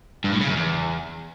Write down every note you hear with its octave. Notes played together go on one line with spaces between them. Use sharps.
G2
A2
C#3
F#2
E2